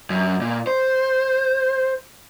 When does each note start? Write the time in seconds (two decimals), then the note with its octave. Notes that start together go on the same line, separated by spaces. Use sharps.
0.10 F#2
0.41 A#2
0.67 C5